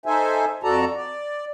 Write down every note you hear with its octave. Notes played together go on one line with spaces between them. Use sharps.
D#4 A4 C5 E5 G#5
F2 F#4 A4 D5 A5 A#5
D5